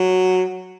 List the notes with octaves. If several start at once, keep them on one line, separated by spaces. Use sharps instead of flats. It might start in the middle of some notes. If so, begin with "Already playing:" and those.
Already playing: F#3